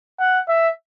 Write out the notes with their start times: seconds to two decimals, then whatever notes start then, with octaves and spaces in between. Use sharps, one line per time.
0.20 F#5
0.49 E5